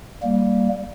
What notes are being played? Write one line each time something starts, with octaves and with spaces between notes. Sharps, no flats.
G3 A#3